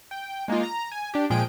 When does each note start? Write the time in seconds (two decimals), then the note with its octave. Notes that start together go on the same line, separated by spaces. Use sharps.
0.11 G5
0.48 G#3 A#3 D#4 F4
0.63 A#5
0.92 G#5
1.14 D4 G4
1.30 A#2 F3 G#3 G#4 G5 D7